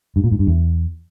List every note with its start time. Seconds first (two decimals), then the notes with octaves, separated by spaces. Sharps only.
0.16 G2
0.24 A#2
0.31 G#2
0.39 G2
0.47 E2